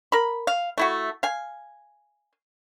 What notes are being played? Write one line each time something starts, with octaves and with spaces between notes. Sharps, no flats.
A#4 B5
F5
A3 E4 F#4
F5 G#5